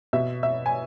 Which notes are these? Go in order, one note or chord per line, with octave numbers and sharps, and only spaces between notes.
B2 E5
E5
G#5